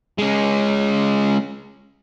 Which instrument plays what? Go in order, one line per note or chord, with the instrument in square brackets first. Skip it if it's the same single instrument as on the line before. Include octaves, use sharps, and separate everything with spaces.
[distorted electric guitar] G#3 C#4